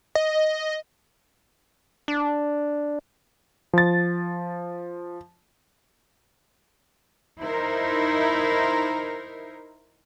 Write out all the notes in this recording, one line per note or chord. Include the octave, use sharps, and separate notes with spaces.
D#5
D4
F3 A6
D#4 E4 A#4 C5